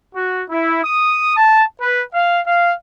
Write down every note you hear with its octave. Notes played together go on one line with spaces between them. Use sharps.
F#4
E4
D#6
A5
B4
F5
F5